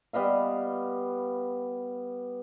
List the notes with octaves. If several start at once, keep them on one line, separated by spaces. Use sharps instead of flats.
G3 B3 D#5 F5